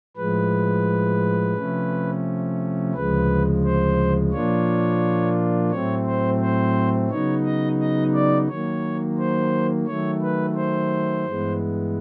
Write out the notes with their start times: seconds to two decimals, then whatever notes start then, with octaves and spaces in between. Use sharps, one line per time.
0.17 A2 F3 G#3 B4
1.55 C3 F3 A3 C#4
2.94 D2 C#3 F3 G#3 B4
3.64 C5
4.32 A#2 F3 A#3 D4 F4 C#5
5.71 A2 F#3 A3 C4 C#5
6.05 C5
6.40 C5
7.10 C#3 F#3 B3 D#4 C#5
7.44 D#5
7.79 D#5
8.13 D5
8.48 D#3 F#3 A#3 C#5
9.18 C5
9.86 D#3 F#3 A3 C#5
10.22 B4
10.55 C5
11.25 G2 E3 G#3 B3